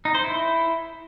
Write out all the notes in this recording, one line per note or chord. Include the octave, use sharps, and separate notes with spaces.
D#4
C5
E4